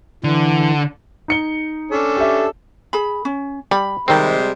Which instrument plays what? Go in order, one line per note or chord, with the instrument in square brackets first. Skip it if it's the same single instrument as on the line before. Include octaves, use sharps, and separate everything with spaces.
[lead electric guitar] D3 [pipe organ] E3
[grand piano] D#4 C#7 G7
[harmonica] C#4 D4 A4
[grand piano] G4 E5
[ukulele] G#4 B5
C#4
[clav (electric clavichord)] G3 [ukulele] B5
[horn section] C3 G3 G#3 [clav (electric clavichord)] D#3 C4